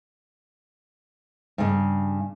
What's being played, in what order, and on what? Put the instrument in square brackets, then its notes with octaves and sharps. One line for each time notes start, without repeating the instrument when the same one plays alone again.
[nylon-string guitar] G2 C#3